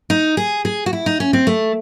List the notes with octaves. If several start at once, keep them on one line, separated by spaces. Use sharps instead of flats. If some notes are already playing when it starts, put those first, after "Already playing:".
D#4
G#4
G#4
F#4
E4
D#4
C#4
C4
A3